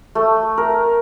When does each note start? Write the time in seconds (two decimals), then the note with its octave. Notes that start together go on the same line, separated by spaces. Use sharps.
0.15 A3
0.58 A#4